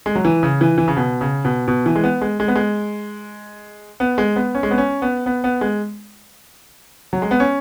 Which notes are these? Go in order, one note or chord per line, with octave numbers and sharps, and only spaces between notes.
G#3
F#3
E3
C#3
E3
E3
C#3
B2
C#3
B2
B2
E3
G#3
B3
G#3
G#3
B3
G#3
B3
G#3
B3
C#4
G#3
B3
C#4
B3
B3
B3
G#3
F#3
G#3
B3
C#4